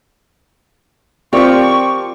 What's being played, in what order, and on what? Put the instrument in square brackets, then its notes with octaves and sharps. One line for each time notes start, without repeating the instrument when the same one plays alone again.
[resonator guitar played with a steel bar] F3 G4 [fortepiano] C4 [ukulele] F4 A#4 D5 [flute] C#6